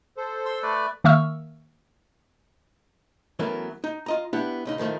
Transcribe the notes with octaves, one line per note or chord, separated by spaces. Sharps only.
A4 C5
C6 E6
A3 B4 D5
D#3 A#3 E5 C#6 E6 F6
E3 F#3 A3 B3 C#4 A#4
D#4
F4 D#5 A#5
B3 D4 E4 G4 F#5
B1 C#3 D#4
A2 D#3 F3 A3